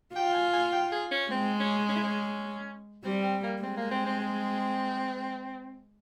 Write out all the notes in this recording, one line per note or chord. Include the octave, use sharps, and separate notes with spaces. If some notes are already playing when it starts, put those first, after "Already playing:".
F4 G5
G#5
G#5
G5
G#4
C#4
G#3 C4
C#4
C#4
E4
C#4
G3 C4
C4
A#3
G#3 C4
A#3
C4
C4
C4